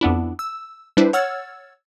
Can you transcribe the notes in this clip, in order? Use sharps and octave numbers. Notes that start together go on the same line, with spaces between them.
F2 B3 D4 E4
E6
G3 D4 E4 B4 C5
C#5 F#5 E6 F6 G#6 A6